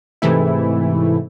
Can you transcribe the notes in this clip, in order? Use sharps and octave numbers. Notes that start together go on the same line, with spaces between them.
G#2 C3 E3 A3 E4